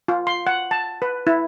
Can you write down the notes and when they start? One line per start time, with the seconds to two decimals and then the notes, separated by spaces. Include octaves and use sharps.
0.08 F4
0.27 C6
0.47 F#5
0.71 A5
1.02 B4
1.27 E4